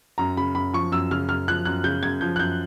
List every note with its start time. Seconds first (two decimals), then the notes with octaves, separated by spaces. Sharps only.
0.18 F#2 A#5
0.37 C#3 B5
0.55 F#2 B5
0.73 F3 C#6
0.92 F#2 E6
1.11 C#3 F6
1.29 F#2 F6
1.48 F3 F#6
1.65 F#2 F#6
1.84 C#3 G6
2.03 F#2 G#6
2.21 F3 G6
2.36 F#6
2.39 F#2 G6